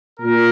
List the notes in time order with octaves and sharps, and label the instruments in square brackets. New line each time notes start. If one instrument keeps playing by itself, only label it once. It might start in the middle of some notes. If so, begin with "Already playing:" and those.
[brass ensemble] A#2 A#4